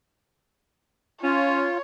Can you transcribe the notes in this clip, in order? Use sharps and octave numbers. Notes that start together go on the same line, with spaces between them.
C#4 F4 C#5